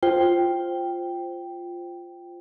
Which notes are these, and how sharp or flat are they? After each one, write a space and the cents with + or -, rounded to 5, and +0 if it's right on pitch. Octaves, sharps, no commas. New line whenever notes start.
F4 +0 C5 +5 G5 +0